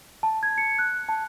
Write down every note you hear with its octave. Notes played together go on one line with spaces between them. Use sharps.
A5
G#6
C#7
F#6
A5